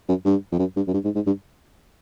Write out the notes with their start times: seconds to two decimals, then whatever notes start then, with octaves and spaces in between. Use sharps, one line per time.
0.09 F#2
0.25 G2
0.52 F2
0.59 F#2
0.76 G2
0.87 F#2
0.94 G2
1.05 G#2
1.15 G#2
1.27 G2